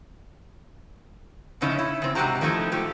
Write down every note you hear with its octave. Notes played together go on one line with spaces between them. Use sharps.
F2 A2 C#3 C#4 D#4 E4
E4
C#3 C4
G#2 C3 F#3 F#4 G4 A#5
D#3 F3 A3 B3 D#4 E4
G#2 F3 A3 G4